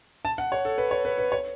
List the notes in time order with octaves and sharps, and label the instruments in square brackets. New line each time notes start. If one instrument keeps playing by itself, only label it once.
[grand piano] A5
F#5
C#5
A4
B4
C#5
B4
B4
C#5